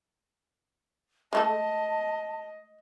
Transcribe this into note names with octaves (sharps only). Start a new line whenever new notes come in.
G#3 A3 A4 D#5 A5